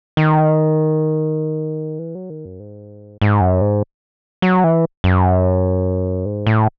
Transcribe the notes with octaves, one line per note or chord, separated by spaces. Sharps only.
D#3
E3
F#3
D#3
F#2
G#2
G#2
F#2
G#2
F#3
E3
F#2
G#2
A2